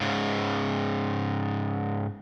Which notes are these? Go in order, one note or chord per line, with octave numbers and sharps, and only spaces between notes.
G#2 C#3